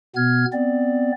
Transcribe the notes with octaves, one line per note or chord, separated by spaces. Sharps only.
B2 B3 F6 G#6
B3 C4 D5